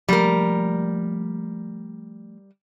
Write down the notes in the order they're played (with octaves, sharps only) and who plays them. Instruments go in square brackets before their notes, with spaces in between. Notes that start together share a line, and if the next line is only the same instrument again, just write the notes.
[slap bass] F3 A3 A#3 [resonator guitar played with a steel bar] G3 A#4